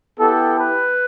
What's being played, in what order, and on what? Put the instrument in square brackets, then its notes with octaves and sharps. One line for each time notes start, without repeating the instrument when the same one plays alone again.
[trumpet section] B3 E4 G4 A4
B4